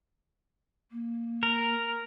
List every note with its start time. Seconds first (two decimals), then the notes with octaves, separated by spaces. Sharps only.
0.91 A#3
1.43 A#4